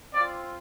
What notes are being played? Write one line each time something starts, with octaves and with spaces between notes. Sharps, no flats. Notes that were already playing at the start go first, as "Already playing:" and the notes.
C4 F4 D5